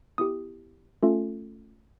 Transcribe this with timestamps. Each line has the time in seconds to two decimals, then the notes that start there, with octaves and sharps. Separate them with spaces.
0.18 B3 E4 G4 D#6
1.03 A3 C#4 F4 A4